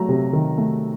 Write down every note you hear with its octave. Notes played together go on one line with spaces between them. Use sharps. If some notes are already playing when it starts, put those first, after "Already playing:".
Already playing: F#3 A3 A#5
C3
D#3
A3